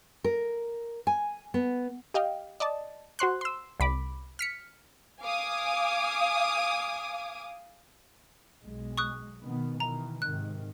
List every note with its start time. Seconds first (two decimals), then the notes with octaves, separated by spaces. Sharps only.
0.24 A#4
1.07 G#5
1.54 B3
2.14 G4 D#5 F5 G5
2.60 D5 D#5 A5
3.19 F#4 C5 C6 F#6
3.41 C6 E6
3.80 C2 B5 D6
4.39 F6 B6 C#7
5.20 F5 G#5 D6 D#6
8.61 B1 G#3
8.98 C#6 D#6 F#6
9.42 B2 D#3 B3
9.80 B2 D#3 E3 A#5
10.22 G#2 C3 D#3 F#6